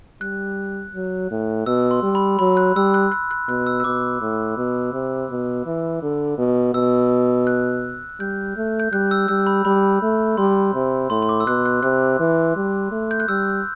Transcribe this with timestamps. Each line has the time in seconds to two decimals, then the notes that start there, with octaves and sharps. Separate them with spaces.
0.21 G3 F#6
0.95 F#3
1.31 A2
1.66 B2 E6
1.91 C6
2.03 G3
2.15 B5
2.39 F#3 B5
2.57 F#6
2.76 G3 E6
2.94 F#6
3.12 F#6
3.31 F#6
3.48 B2 F#6
3.66 E6
3.80 E6
3.84 B2 D6
4.21 A2
4.57 B2
4.93 C3
5.30 B2
5.66 E3
6.02 D3
6.38 B2
6.74 B2 E6
7.47 F#6
8.20 G3 G6
8.57 A3
8.80 G6
8.92 G3 F#6
9.11 E6
9.28 G3 E6
9.47 B5
9.65 G3 B5
10.02 A3
10.37 G3 C6
10.74 C3
11.10 A2 C6
11.22 C6
11.29 D6
11.40 E6
11.46 B2 F#6
11.65 F#6
11.82 C3 F#6
12.20 E3
12.56 G3
12.92 A3
13.11 G6
13.20 F#6
13.28 G3 E6